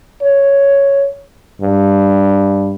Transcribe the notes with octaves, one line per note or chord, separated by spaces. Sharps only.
C#5
G2